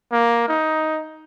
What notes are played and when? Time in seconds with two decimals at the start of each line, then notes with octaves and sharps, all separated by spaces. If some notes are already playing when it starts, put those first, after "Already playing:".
0.12 A#3
0.48 D#4